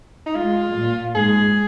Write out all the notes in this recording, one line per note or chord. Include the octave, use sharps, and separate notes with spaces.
D#4
G#3 F4
A#2
G#2 G#4